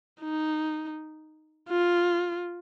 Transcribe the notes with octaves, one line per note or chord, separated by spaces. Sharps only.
D#4
F4